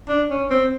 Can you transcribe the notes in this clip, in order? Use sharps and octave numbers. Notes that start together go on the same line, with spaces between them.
D4
C#4
C4